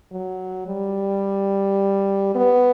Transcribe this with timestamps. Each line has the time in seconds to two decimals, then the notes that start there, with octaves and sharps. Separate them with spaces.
0.11 F#3
0.67 G3
2.35 B3